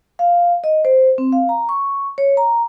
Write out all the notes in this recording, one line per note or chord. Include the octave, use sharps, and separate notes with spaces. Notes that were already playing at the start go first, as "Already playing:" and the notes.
F5
D#5
C5
C4
F5
A#5
C#6
C#5
A#5